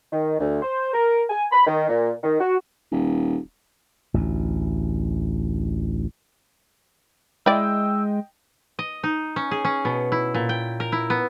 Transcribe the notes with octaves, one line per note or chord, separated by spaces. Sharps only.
D#3
D2
C5
A#4
G#5
B5
D#3
A#2
D#3
F#4
D#1
A1 D2
G#3 E4 D5 D#5 G5 E6
D#5
D#4
C#4
G#4
C#4
B2
E4
A#2
G5
A#4
E4
B3